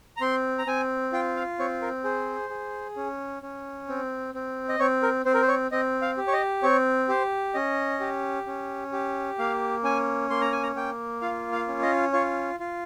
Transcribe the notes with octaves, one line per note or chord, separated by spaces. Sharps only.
A#5
C4 C6
A#5
C4 G#5
F4 G5
F5
C4 C#5
A#4
G#4 C5
G#4
C#4
C#4
C4
C4
D#5
C4 C#5
A#4
C4 C5
A#4
C5
C#5
C4 D#5
F5
G4
C#5
D#5
C4 C#5
G4 C5
C#4 D#5
G4
C#4
G4
A#3 F5
C#4 G#5
A#3 C6
A#5
G#5
A#5
A#3 G5
F4 F5
F5
C#4
D#5
F4 C#5
F4